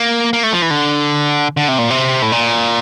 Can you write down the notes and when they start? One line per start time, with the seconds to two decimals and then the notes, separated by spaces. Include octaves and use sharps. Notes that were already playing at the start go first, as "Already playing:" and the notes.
Already playing: A#3
0.33 A#3
0.43 A3
0.53 F3
0.62 E3
0.71 D3
1.57 D3
1.68 C3
1.78 A#2
1.90 C3
2.22 A2
2.32 A#2